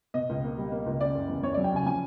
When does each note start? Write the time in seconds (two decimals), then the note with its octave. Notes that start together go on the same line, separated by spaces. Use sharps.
0.14 B2 D#5
0.29 C#2
0.44 A#3
0.58 G3
0.72 A#3
0.86 C#2
1.00 C#3 D5
1.15 F#1
1.29 E2
1.43 E2 C#5
1.54 F#3 D5
1.64 G5
1.72 C#3 G#5
1.86 F3 G#5